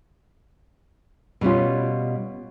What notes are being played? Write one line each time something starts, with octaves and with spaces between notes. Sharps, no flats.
B2 G3 C#4 F4